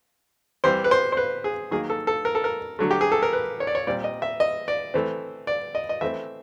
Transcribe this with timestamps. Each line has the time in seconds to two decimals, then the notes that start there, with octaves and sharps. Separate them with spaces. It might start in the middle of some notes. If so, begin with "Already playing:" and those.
0.64 E3 G3 C4 C5
0.84 B4
0.91 C5
1.12 C5
1.17 B4
1.44 G#4
1.71 D#3 F#3 A#3 G#4
1.90 A4
2.07 A4
2.25 A#4
2.35 A4
2.44 A#4
2.79 D3 F#3 A3
2.91 G4
3.01 G#4
3.12 A4
3.23 A#4
3.33 B4
3.60 C#5
3.67 D5
3.75 C#5
3.87 A#2 G3 C4 D5
4.04 D#5
4.22 E5
4.40 D#5
4.68 D5
4.94 E3 A3 C4
5.47 D5
5.75 D#5
5.89 D#5
6.01 E3 A3 C4 E5